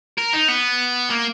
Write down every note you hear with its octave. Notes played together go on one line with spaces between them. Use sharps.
A#4
D#4
B3
A#3